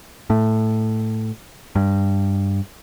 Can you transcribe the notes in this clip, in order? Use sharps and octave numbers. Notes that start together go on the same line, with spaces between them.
A2
G2